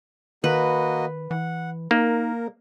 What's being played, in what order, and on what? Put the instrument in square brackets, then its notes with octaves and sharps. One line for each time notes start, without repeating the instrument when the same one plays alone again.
[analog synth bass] D#3 [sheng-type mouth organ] A#3 F#4 D#5 [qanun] B4
[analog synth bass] E3 [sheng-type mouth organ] F#5
[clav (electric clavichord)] A#3 [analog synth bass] D#4 [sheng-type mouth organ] A#4